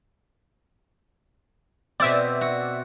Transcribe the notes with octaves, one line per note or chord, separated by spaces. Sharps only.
B2 C4 D5 E5
F#4